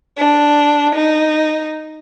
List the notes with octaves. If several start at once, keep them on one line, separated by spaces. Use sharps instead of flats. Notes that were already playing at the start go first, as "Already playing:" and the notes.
D4
D#4